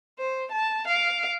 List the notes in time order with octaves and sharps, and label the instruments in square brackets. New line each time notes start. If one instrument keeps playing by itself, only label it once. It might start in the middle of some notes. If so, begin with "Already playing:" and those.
[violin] C5
A5
F5 D7